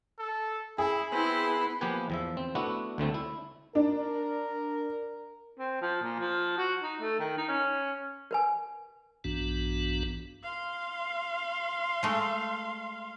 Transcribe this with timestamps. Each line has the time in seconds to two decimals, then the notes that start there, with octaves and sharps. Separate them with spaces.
0.19 A4
0.78 E4 G#4
1.12 B3 C4 E4 B4 C6
1.81 F3 A#3 B3 G4 B4 G#5
2.10 E2 F3 E5
2.37 C4
2.55 A3 B3 D4 E4 F#4
2.98 D2 D3 A3 C4
3.14 E4
3.75 D4 A#4
5.58 C4
5.81 F3
6.02 A#2
6.19 F3
6.58 F#4
6.82 D#4
7.01 A3
7.19 D#3
7.37 D#4
7.48 C#4
8.31 A#4 B4 G#5
9.24 A#1 G2 E3 B3 D4 F#4
10.43 F5 C6
12.03 G#3 A3